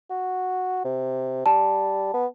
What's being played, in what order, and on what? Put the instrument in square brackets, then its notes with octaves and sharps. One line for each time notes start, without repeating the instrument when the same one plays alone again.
[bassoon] F#4
C3
[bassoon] G3 [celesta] A5
[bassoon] B3